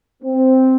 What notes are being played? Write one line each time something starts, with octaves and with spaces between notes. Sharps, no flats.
C4